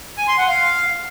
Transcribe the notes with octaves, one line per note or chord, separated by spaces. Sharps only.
G#5
C6
F#5
F5